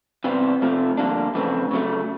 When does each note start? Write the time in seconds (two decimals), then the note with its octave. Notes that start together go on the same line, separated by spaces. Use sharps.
0.24 E2 C3 E3 G3 C4
0.62 C3 F3 A3
0.97 F2 D3 G3 A#3 D4
1.34 F2 C#3 E3 A3 C4
1.71 C#3 F#3 A3